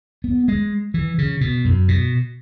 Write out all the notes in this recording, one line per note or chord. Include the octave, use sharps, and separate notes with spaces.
B3
G#3
E3
C#3
B2
F#2
B2